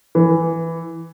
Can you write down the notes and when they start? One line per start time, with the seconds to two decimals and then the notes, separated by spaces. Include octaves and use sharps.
0.15 E3